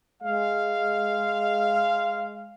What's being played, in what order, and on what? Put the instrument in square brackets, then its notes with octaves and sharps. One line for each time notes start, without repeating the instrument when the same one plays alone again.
[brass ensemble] G#3 F5